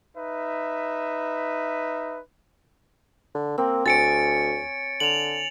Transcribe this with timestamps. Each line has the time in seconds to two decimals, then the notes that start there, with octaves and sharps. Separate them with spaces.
0.17 D#4 B4 E5
3.35 D3
3.58 A#3 C4
3.86 D2 C#5 G#5 A6 C#7 D7
5.00 D3 F7 F#7